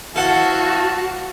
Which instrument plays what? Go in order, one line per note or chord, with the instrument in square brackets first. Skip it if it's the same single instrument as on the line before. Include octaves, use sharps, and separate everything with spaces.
[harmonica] E4 F5 A5 [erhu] F#4 [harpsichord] A4 F#5